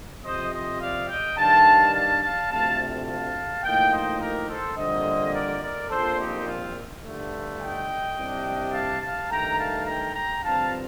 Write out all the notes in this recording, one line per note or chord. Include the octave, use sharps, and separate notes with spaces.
F2 C3 F3 C5 D#5
C5 D#5
D5 F5
D#5 G5
G2 D#3 G3 D4 F5 A5
F5 A5
F5 A5
D2 C3 F3 A3 F5 A5
F5 A5
A2 F3 A#3 D#4 D#5 G5
C5 D#5
G4 A#4
A4 C5
F2 D3 G3 A#3 C5 D#5
A#4 D5
A#4 D5
A#1 A#2 F3 C4 A4 C5
D#4 G4
F4
G1 G2 D3 A3
D#5 G5
C2 C3 G3 D4
F5 A5
F5 A5
G2 D#3 A3 G5 A#5
F5 A5
G5 A#5
G5 A#5
G2 D3 F3 C4 F5 A5